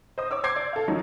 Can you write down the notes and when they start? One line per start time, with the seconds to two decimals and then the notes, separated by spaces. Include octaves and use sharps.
0.18 C5 D#5 D#6
0.31 C#5 D6 E6
0.44 C5 C6 D6 G6 G#6 C7
0.56 D5
0.73 A4 F5
0.88 D#3 F3 F#3 D#4 F4